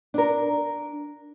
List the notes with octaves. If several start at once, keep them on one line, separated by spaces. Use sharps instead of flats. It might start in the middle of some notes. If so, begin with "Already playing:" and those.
D4 A#4